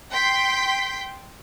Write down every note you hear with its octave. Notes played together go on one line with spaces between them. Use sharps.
G5 C6 B6